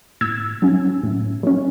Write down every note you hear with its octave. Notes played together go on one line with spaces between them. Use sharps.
A2 E6 G#6
F#3 C#4
A2
F#3 C#4